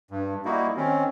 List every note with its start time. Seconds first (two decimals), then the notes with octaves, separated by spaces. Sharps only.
0.11 G2
0.45 G3 A#3 D#4 E4 F#4
0.77 D#3 C4 C#4